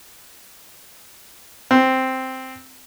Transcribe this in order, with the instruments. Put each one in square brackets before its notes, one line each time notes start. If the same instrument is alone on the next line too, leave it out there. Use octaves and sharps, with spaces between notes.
[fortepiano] C4